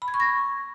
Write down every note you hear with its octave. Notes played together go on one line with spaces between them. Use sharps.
B5
G#6
C#6
A#6